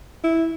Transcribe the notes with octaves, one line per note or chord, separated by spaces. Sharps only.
E4